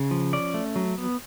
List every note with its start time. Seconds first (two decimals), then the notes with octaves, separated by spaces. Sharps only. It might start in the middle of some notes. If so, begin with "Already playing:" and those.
Already playing: C#3
0.11 F3
0.33 C#4 D5
0.54 A3
0.76 F#3
0.98 B3